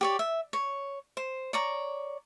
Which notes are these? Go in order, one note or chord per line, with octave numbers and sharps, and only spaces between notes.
G4 C#5 D5
E5
C#5
C5
C#5 D5 A#5